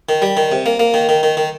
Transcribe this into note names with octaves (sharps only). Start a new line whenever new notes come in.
D#3
G3
D#3
C3
A#3
A#3
D#3
D#3
D#3
D#3